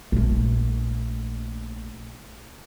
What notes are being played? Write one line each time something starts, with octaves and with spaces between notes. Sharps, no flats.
A#1 A3